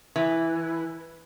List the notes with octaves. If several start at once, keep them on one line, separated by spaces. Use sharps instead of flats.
E3